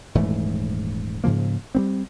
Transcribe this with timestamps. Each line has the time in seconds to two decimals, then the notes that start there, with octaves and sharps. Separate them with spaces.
0.15 D#1 G#2 E3 A3
1.24 G#2 C#3 F3 A#3
1.75 G3 B3 C4